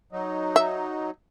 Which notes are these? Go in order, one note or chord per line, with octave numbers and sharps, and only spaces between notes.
F#3 D#4
E5